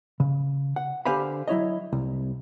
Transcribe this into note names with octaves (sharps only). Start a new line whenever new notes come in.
C#3
F#5
D3 G4 C5 F5 G#5 B5
F#3 E4 C#5 D#5
C2